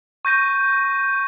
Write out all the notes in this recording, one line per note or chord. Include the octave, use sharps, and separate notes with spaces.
C#6 G6 A#6 D#7